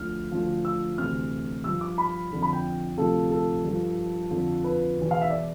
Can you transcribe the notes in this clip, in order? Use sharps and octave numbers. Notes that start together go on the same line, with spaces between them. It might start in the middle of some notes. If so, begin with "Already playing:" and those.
Already playing: D2 D3 F3 F6
D2 D3 F3
E6
D2 C3 E3 F6
G2 F3 E6
D6
B5
F2 D3 F3
B5
G5
D2 C3 F3 A4
A4
G2 F3
F2 D3 F3
B4
E2 B2
F5
E5
D5